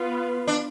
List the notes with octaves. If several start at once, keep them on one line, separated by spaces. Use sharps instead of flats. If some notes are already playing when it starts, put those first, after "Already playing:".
Already playing: B3 F4 B4
D4